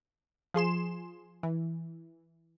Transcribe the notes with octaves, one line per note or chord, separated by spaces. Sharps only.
F3 G#4 C6 E7
E3